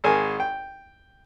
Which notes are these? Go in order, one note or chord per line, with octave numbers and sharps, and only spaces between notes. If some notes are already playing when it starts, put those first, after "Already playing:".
G#1 G#4 A#4 G#5
G5